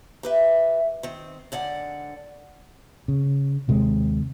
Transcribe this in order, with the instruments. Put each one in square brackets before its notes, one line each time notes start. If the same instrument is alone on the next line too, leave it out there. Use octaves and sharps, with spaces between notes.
[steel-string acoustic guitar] G4 B4 E5
D#3 C4
G#2 D3 D5 F#5
[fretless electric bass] C#3
D#2 C3 G#3 C4